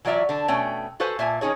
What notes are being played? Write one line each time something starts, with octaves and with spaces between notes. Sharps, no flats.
E3 F#3 F4 D5 E5 A#5
D3 D4
B2 A3 C#4 G5 G#5
F#4 A4 B4 C5 F5 G#5
A#2 E5 G#5 A5
D#3 C#4 D#4 G#4 C#5